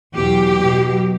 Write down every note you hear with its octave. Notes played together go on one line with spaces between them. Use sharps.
E2 B2 F#3 G4
B2 F#3